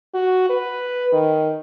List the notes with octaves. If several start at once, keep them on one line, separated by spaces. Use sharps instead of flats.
F#4
B4
D#3